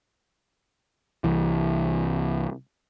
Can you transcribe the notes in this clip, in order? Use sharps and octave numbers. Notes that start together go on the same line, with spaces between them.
C2 E3